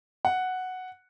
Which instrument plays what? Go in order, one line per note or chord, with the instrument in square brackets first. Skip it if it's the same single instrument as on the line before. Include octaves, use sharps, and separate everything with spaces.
[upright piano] F#5